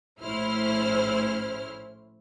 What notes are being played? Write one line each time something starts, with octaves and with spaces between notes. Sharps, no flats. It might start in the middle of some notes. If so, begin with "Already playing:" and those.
A#1 A2 C#4 E4 C5 F6